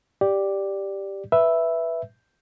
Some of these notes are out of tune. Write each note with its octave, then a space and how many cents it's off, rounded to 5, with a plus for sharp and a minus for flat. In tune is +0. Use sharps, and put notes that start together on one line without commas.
G4 +0 D5 +0
B4 +0 E5 +0